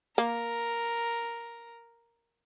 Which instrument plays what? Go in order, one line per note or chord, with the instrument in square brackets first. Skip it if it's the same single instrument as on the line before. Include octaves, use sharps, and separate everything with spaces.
[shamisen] A#3 [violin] A#4